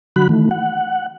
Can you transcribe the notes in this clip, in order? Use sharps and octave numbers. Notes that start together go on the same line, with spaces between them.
D3 F#3 F#4 B5 F#6
D#3 E3 A3
F#5